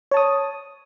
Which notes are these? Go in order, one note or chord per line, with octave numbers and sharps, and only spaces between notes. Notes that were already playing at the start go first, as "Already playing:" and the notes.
C#5 A5 D#6